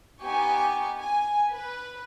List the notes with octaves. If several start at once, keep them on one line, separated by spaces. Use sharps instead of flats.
B3 D#4 G4 G#5 C#6
G#5
B4